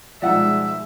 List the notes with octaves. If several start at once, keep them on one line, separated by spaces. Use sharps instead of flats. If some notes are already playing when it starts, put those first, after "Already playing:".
B2 F3 G3 G#3 D#4 D5 E5 F#5